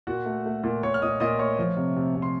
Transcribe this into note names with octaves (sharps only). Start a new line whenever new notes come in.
A#2 F#4 F#5
A3
A3
A#2
A#2 C#5 C#6
F6
A#2 D#5 D#6
A#2 D#5 D#6
A3 C#5 C#6
F3
C3
C3
C3
C6